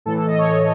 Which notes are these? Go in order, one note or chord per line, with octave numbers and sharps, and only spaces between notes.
A2 E3 A4
A4
D#5
C#5